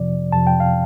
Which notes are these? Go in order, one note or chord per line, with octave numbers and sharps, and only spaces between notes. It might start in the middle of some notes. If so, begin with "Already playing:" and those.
Already playing: F2 C3 F3 D5
F2 C3 F3 A5
G5
F5